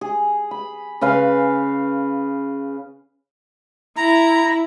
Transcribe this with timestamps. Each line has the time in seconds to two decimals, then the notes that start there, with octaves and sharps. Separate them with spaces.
0.01 G#4
0.51 B5
1.01 C#3 B4 F5 G#5
3.97 E4 A#5